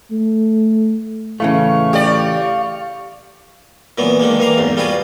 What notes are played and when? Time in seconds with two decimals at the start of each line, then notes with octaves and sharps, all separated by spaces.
0.11 A3
1.40 A2 C#3 E3 A3 F5 C#6
1.93 G4 D5
3.98 A#2 E3 F#3 B3
4.20 D3 D#3 G#3 A#3
4.39 E3 A#3 F5 A#5
4.58 B1 E2 G#2
4.77 G3 F4 F#4 G#4 B4